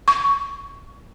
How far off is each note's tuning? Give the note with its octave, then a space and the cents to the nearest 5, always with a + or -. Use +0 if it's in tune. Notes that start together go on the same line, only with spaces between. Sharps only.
C#6 +10